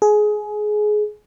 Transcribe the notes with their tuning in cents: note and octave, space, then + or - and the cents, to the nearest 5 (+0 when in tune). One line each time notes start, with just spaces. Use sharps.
G#4 +20